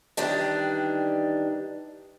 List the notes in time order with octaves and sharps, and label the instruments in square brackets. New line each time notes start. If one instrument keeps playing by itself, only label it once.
[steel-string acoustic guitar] D#3 E3 G3 D4